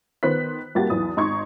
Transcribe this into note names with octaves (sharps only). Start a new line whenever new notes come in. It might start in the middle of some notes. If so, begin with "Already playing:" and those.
D#3 B3 C5 F#6 B6
C2 A#3 F#4 G4 A6
B1 E2 E3 D#6
G#1 D#4 C6 C#6 G#6